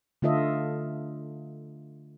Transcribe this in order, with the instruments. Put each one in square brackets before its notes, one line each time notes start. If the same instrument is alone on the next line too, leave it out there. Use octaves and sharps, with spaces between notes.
[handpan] D3 A3 F4 A4 D#5 E5